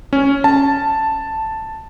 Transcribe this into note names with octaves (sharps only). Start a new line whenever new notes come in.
C#4
A5